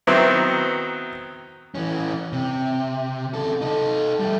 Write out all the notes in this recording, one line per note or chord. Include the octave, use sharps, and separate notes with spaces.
D#3 F#3 B3 C4 E4
E3 C#4
C3
C#3 A4
D#4 A4
G3 A3